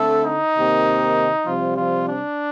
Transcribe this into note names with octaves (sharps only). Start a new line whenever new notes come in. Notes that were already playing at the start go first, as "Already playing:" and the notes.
Already playing: D3 A3 C4 A4
D#4
C3 D#3 A#3
C3 F3 G3 C4 F4
F3 F4
D4